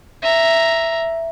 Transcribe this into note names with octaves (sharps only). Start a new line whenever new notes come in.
E5 A#5